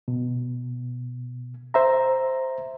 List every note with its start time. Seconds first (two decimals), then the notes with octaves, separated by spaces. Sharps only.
0.08 B2
1.74 C5 E5 A#5